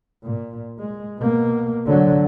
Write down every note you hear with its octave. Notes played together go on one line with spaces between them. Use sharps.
A#2
G#3
B2 A#3
D3 F#3